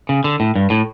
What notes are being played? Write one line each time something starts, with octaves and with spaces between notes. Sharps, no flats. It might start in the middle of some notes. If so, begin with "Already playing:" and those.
C#3
D3
A2
G2
A2